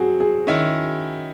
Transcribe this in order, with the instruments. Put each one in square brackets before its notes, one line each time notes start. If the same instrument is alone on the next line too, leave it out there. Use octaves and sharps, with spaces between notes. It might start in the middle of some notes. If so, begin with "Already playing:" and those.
Already playing: [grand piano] F#3 C4 [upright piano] F#4 G#4
[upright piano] G#4
[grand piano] D#3 G#3 C#4 E4